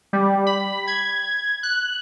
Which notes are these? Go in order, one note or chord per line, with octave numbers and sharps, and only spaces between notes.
G3
B5
G#6
F#6